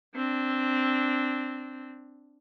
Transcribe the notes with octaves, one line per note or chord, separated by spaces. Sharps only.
C4 D4